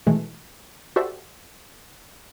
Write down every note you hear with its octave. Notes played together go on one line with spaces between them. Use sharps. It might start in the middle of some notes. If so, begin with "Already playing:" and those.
B2 D#3 E3 F#3 G#3 A3
F#4 G4 A4 C5 D5 E5